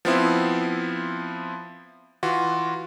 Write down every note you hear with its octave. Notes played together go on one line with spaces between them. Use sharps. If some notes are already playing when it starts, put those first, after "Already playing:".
F3 B3 C4 E4
E3 F4 F#4